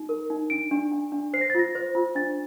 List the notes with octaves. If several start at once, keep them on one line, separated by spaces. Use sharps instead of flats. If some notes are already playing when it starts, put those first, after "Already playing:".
Already playing: D#4
A#4
D#4
D4 D7
D4
D4
D4
C5 C7
A#6
A6
F4 A#6
C5
F4
D4 A6